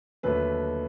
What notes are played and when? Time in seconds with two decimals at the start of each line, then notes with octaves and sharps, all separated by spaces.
0.23 D#2 D3 F#3 A3 B4